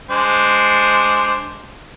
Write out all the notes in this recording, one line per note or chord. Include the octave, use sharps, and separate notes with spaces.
G#3 D4 C5